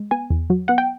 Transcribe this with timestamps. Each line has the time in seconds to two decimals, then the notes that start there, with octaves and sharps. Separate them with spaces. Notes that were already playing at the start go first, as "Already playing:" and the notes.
Already playing: G#3
0.11 B3 G#5
0.30 E2
0.50 F#3
0.68 B3 F#5
0.78 G5